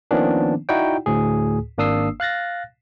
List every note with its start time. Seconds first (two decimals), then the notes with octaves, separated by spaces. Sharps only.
0.11 D#3 F3 A#3 B3 C#4 D4
0.69 D#4 E4 F#4 D5 F#5 G5
1.06 D2 A2 G#4
1.78 G#1 A#3 D4 D#6 E6 C7
2.20 F5 F#6 A6 A#6